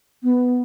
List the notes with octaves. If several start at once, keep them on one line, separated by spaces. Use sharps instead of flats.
B3